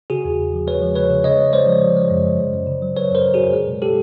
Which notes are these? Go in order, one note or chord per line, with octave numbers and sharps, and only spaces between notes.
C#3 F#4 G#4
E2
C#3
F3
G#3 B4 C#5
F3
C#3 B4 C#5
C#3
C#3 C#5 D#5
G#3
G#3 C5 D5
F3
F3
G#3
F#2
F#2
F#2
F#2
C#3
F#3
F#2 B4 C#5
F#2 A#4 C5
C#3
F#2 F#4 G#4
G#3
B2
G#3 G4 A4